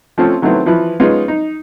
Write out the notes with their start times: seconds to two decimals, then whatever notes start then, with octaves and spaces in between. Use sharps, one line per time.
0.18 F3 A3 C4 C#4 F4
0.42 D#3 F#3 A3 B3 C4 E4
0.66 E3 F3 E4 B4
1.00 G#3 B3 C#4 D#4 F4
1.28 D#4